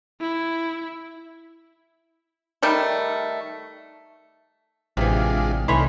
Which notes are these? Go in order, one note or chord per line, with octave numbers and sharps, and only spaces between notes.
E4
D#3 G3 A3
A1 C3 E3 G#3 D4 F4
C2 D#3 E3 A3 C#5 B5 C6